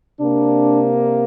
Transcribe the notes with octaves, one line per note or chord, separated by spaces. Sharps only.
C3 A#3 D4